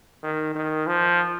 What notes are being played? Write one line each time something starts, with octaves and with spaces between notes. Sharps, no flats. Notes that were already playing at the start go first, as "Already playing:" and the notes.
D#3
D#3
F3